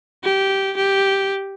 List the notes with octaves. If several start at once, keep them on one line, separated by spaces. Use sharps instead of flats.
G4
G4